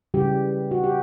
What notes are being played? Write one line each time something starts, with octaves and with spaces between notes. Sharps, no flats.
C#3 E3 G3 G4
F#4
G4